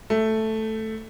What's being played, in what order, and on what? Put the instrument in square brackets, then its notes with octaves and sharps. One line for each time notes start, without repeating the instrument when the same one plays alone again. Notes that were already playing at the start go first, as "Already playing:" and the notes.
[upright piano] A3